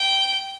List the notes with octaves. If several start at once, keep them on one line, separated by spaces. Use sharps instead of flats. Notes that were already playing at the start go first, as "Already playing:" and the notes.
Already playing: G5